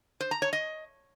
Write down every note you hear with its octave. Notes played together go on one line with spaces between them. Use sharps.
C5
A#5
C#5
D#5